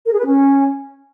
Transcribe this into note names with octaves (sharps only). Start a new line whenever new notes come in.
A#4
G#4
B4
C#4